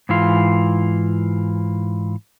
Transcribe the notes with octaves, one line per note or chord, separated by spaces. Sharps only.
G#2 E3 F4